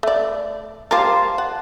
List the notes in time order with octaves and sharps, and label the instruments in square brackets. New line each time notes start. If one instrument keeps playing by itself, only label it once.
[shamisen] A3 D5
[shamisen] G3 A#4 [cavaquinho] F4 C5 A5
[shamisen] F#5